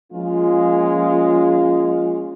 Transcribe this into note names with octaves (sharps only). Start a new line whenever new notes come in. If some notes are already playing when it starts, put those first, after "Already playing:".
F3 G#3 A#3 C#4 F4